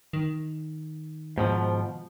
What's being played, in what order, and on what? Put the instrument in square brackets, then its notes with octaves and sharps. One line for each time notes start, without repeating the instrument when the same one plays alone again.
[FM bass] D#3
[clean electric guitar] G#2 B2 F3